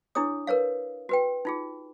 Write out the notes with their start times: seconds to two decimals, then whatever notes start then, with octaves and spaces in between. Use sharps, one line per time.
0.15 D4 E4 G#4 C#5 D#6
0.47 A#4 B4 C#5 F5
1.09 F#4 B4 G5
1.45 D#4 F4 G#4